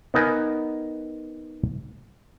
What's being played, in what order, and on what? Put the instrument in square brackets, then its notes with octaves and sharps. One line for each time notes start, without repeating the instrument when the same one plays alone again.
[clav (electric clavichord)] B3 D#4 A#4 G#5